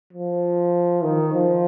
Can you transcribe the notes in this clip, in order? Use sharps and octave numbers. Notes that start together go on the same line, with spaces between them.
F3
D#3
F3